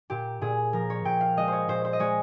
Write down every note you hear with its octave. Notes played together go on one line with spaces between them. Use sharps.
A#2 G4
A#2 G#4
F3 A#4
C#5
A#2 G5
F5
G#3 D#5
C5 C#5
A#2 C5
C5
D#5
G#3 C#5